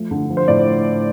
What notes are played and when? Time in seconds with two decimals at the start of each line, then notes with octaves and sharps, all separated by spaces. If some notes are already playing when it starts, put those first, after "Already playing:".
Already playing: F3 A3
0.11 D3
0.30 F3
0.37 C5
0.48 A2 D5